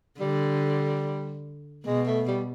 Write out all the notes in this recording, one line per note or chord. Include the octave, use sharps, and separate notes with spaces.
D3 G3
B2 G#3
A3
G3